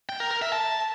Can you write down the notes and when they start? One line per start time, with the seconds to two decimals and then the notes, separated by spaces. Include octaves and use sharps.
0.09 G5
0.20 A#4
0.31 A#4
0.42 E5
0.53 A5